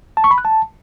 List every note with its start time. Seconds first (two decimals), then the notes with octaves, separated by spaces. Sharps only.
0.17 A5
0.24 C#6
0.31 B5
0.38 F#6
0.45 A5